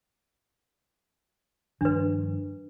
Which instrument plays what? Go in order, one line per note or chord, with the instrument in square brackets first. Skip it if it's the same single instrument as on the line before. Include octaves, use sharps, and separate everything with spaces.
[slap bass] G2 D#3 F3 [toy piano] D4 B4